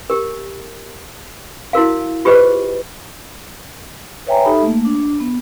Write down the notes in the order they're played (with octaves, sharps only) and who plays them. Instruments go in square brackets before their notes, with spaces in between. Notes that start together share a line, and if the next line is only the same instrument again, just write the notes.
[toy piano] G4 A#4
E4 F#4 A#4 F5
F4 G4 G#4 B4 C5 D#5
[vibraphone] B4 C#5 E5 G5 G#5 A#5
D#4 G4 A4 E5 B5
A3 A#3
D4
B3